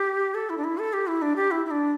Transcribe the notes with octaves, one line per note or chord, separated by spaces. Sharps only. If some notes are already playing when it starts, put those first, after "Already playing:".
Already playing: G4
A4
E4
D4
E4
A4
G4
E4
D4
G4
E4
E4
D4